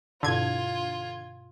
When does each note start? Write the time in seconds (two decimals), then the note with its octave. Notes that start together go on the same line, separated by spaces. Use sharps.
0.23 G2 B2 D3 E4 F4 G#6